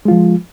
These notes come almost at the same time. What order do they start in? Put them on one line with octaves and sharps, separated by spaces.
G#3 F4 F3